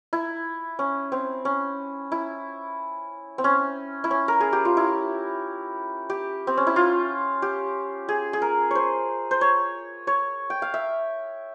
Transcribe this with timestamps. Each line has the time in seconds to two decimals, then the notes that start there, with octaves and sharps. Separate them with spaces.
0.13 E4
0.79 C#4
1.12 C4
1.45 C#4
2.12 E4
3.38 C4
3.44 C#4
4.04 E4
4.11 C#4
4.28 A#4
4.41 G#4
4.53 G4
4.65 F4
4.77 E4
6.10 G4
6.47 C4
6.57 C#4
6.67 E4
6.76 F4
7.42 G4
8.09 G#4
8.33 G#4
8.42 A#4
8.71 C5 C#5
9.31 C5
9.41 C#5
10.07 C#5
10.50 G5
10.62 F5
10.74 E5